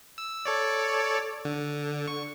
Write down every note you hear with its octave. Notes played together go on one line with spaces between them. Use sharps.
E6
A4 C#5 D5
D3
C#6